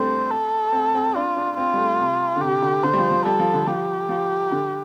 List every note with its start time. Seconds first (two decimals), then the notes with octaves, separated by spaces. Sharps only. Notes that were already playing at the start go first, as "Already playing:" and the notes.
Already playing: G3 A3 C4 D4 C5
0.31 A4
0.73 C4
0.95 C4
1.15 D4 F4
1.37 D4
1.57 C4 F4
1.73 G3
1.78 A3
1.99 C3
2.36 D3
2.41 C3 G4
2.62 D3
2.83 D3 C5
2.93 G3
2.98 F3
3.11 F3
3.25 G3 A4
3.39 F3
3.53 D3
3.67 F3 G4
4.09 F3
4.51 D3